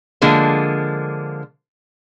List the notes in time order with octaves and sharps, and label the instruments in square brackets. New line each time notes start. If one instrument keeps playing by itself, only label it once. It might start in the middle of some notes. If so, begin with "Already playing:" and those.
[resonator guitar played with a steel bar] D3 F3 G#3 A#3